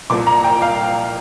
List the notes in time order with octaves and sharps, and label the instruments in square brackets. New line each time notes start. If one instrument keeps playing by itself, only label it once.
[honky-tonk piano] C2 A#2 F3 D6
A#5
G5
F5